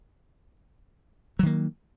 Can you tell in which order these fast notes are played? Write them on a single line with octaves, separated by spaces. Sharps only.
F#3 D#3 A#3